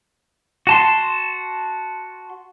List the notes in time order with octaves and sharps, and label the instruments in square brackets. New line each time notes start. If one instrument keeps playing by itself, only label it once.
[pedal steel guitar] F#4 A5 C6